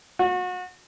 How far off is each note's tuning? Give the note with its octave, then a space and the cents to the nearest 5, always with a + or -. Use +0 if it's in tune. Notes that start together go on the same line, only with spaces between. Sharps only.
F#4 -30